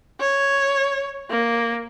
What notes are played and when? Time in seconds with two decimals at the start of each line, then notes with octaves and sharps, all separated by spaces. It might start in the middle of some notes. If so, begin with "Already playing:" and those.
0.20 C#5
1.30 A#3